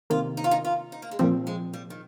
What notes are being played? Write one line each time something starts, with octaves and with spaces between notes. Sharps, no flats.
C3 D#3 A#3 F4
D#4
F4
D#4
F4
D#4
A#3
G#3
A#2 F3 G3 C4
G#3
G3
D#3